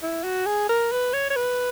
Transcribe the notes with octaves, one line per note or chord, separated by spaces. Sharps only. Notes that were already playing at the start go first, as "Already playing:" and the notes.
E4
F#4
G#4
A#4
B4
C#5
C#5
B4